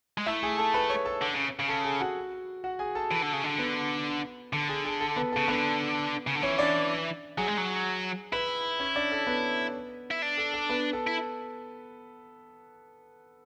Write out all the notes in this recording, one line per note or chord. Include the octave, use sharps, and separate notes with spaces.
G#3
A3 E4 E5
G#4 G#5
A4 A5
B4 B5
C#5 C#6
A4 A5
D3
C#3
C#3
A4 A5
G#4 G#5
F#4 F#5
F#4 F#5
G#4 G#5
A4 A5
E3
D3
C#3
D3
B3 B4
D3 A4
G#4
G#4
A4
B3 B4
C#3 A4
D3 B3 B4
C#3
D3
E3 C#4 C#5
D4 D5
F#3 G#4 G#5
G#3
F#3
E4 B4 B5
C#4 C#5
D4 D5
A4
B3 B4
E4
D4
A4
A4
B3 B4
A4
E4